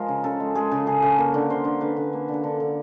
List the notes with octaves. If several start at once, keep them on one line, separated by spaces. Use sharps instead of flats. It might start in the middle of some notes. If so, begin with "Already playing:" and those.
Already playing: F3 G#3 A#4
C#3
C#3 A4
G#3
G#3 G#4
C#3 A4
C#3 G#4
C#3 A4
A#3 A#4
D3
D3 C5
D3
D3 B4
D3
A#3
D3
A4
D3 A#4
D3